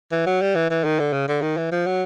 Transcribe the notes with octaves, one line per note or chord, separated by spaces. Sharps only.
E3
F#3
G3
E3
E3
D#3
D3
C#3
D3
D#3
E3
F3
F#3